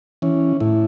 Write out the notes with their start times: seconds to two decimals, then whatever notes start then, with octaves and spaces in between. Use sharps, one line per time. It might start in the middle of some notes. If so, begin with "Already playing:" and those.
0.22 E3 C#4
0.60 A2 E4